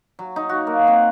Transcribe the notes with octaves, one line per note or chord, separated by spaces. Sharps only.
F#3
D#4
F#4
A#3
C4